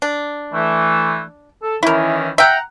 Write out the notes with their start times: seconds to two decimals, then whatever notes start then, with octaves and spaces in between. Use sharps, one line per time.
0.02 D4
0.53 E3 A3
1.62 A4
1.83 D#3 E3 C#4 E4 A#4
2.38 E5 F#5 G5 A#5